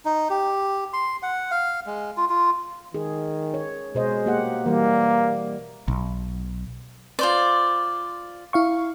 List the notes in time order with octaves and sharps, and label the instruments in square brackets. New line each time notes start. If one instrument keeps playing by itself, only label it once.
[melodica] D#4
G4
C6
F#5
F5
G#3
F4
F4
[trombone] D#3 [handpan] G#4
[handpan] C#5
[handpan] B2 C5 D#5 [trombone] G#3
[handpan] A#3 G4 F#5
[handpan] E3 G3 [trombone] A#3
[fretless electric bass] B1
[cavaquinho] F4 C5 D5
[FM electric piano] E4 F5 C#6